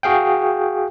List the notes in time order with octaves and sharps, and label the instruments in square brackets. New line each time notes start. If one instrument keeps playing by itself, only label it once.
[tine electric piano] F#4 G#4 F5 G5